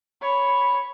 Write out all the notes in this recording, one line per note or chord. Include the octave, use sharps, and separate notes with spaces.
C#5 B5